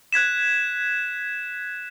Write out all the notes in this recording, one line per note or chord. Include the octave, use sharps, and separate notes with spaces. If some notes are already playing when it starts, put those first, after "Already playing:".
F#6 G#6 B6 E7